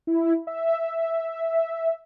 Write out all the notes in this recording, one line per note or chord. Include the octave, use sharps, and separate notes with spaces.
E4
E5